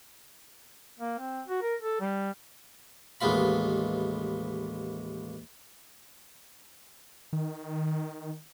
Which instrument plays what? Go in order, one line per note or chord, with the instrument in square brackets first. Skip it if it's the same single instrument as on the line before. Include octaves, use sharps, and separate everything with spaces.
[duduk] A#3
C4
F#4
A#4
A4
G3
[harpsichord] A1 D#2 G#3 B3 F4 B5
[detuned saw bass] D#3